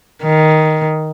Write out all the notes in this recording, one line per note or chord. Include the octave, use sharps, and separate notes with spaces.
D#3